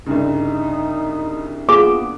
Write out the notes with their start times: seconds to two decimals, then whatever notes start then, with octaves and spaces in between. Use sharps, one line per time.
0.06 C2 G2 C#3 D#4
1.69 A#3 B3 F4 G#4 D6